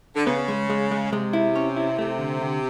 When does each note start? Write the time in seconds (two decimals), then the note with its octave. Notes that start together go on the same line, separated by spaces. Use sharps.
0.15 D3
0.26 C#3 B3
0.48 G#3
0.70 G#3
0.91 G#3
1.12 C3 G#3
1.33 E4
1.56 C#4
1.76 E4
1.98 C3 A3
2.19 D3
2.41 D3